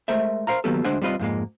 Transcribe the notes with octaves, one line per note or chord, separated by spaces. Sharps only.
G#3 A3 A#4 C5 E5
A#4 C5 F5 A#5
D#3 F#3 A#3 B3 G4 A4
D2 G#3 D4 C5 F#5 G#5
G3 C4 F4 B4 D#5
F2 G#2 G#3 A#3